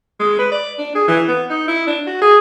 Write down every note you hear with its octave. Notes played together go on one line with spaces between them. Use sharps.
G#3
B4
D5
D4
G#4
E3
B3
D#4
E4
D4
F#4
G#4